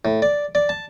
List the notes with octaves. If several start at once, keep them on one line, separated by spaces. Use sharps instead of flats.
A2
D5
D5
A5